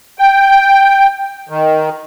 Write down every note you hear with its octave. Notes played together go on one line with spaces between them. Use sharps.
G5
D#3